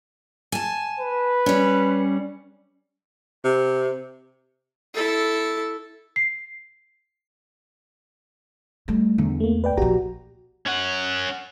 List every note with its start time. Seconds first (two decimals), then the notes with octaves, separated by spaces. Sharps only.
0.52 G#5 A5
0.99 B4
1.46 G3 C#4
3.45 C3
4.94 E4 A4
6.16 C7
8.88 G3 A3
9.18 E2 D3
9.40 A3 A#3
9.64 B4 D5 G5
9.77 A#1 F3 F#4 G4 A#5
10.67 C#4 F#5